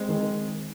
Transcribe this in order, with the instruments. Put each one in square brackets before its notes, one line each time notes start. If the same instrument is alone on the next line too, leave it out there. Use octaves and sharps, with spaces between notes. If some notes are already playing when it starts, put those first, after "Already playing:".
Already playing: [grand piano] G#3 [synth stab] C4
[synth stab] D#3